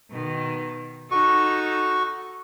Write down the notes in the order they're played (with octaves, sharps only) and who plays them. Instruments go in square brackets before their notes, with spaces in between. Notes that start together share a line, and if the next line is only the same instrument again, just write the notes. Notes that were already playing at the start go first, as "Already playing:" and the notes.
[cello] B2 D#3
[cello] D#4 A4 [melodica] F#4 C#6